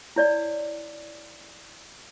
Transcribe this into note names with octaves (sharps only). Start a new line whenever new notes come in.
E4 C#5 D5